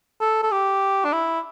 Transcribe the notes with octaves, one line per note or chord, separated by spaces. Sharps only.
A4
A4
G4
D4
E4